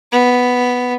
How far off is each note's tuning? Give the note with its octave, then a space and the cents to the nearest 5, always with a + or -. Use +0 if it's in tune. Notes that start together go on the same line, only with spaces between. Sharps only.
B3 +0